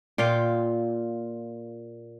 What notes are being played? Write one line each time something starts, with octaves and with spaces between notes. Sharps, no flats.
A#2 F4 F5 G5